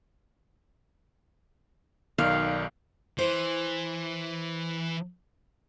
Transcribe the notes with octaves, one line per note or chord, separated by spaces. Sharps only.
B1 D#3 D5 F5
E3 C5